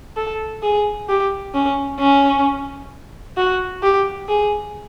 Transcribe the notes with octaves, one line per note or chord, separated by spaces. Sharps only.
A4
G#4
G4
C#4
C#4
F#4
G4
G#4